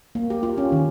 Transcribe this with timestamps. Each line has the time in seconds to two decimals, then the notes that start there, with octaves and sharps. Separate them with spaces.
0.15 A#3
0.30 G4
0.43 F4
0.58 C#4
0.72 D#3